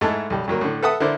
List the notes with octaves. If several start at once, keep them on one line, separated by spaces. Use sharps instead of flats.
G#2 G#3 A3 E4 A5
B1 G3
G2 F#3 A#3
A2 D3
A4 B4 E5 F#5 A5 D#6
D3 E4 A#4 C5 D5